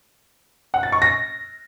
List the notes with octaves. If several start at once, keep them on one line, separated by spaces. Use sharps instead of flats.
F#5
A6
C#6
A#6